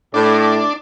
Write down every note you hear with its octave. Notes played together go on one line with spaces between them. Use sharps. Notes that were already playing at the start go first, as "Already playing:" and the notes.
A2 D4